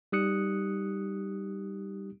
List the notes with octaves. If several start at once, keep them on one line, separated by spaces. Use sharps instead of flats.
G3 D#4 G4 D#6 F#6 C#7